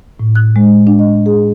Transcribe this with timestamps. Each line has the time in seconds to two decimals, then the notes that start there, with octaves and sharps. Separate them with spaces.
0.20 A2
0.35 F#6
0.56 G#3
0.87 D4
0.99 D#5
1.26 G#4